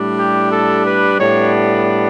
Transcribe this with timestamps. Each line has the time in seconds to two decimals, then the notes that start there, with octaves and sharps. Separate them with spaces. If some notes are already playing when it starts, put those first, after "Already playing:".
Already playing: A2 G3 D4
0.19 G4
0.52 A4
0.85 B4
1.19 A2 G3 B3 D4 C#5